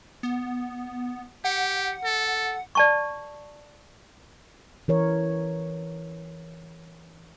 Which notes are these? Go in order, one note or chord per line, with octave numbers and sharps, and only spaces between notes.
B3
G4 F#5
A4
D5 A5 C#6
E3 A#4 C#5